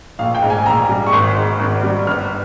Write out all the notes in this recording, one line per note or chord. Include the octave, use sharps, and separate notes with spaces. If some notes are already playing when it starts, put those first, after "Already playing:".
A#1 F5
G5
G#2
G#5
A#1 A#5
G3
C#6
G#1 C6
G#2
G#1
G3
G1 F6